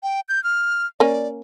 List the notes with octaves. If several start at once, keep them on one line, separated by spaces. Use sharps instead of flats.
G5
G6
F6
A#3 C#4 D5